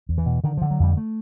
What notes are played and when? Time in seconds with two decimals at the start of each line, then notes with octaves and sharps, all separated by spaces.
0.09 E2
0.18 E3
0.26 B2
0.44 D3 D#3
0.57 D3 F3
0.71 F#3
0.80 F2 G3
0.97 A3